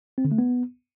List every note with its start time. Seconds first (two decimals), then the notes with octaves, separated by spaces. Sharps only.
0.18 C4
0.25 D3
0.32 A3
0.38 B3